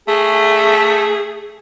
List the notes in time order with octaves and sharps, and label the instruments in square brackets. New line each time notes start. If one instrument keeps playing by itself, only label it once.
[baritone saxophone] A3 [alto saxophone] G#4